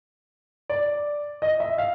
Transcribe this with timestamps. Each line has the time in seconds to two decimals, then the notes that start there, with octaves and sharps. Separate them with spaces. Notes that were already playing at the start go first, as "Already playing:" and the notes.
0.70 D5
1.42 D#5
1.60 E5
1.78 F5